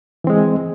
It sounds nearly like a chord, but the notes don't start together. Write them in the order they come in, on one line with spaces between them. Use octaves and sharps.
E3 C4 G#3